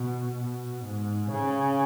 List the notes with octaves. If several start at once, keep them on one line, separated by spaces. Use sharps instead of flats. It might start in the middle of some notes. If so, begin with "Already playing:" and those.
Already playing: B2
B2
G#2
C#3